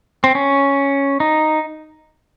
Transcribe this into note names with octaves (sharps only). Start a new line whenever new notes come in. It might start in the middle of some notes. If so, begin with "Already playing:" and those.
C4
C#4
D#4